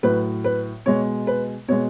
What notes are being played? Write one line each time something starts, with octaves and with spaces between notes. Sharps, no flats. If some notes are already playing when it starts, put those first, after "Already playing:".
A2 F#3 B4
B4
B2 G#3 C#5
B4
B2 G#3 C#5